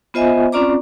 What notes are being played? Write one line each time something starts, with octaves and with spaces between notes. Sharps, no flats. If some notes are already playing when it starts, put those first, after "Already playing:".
B3 F4 C5 D#5 E5 G#5
C4 C#4 F4 D5 A#5 D6